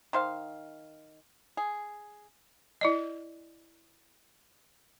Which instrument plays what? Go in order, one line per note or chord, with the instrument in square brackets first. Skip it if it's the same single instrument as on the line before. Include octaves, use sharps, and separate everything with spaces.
[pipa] D#3 C5 F5
G#4
[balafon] E4 D5 D#5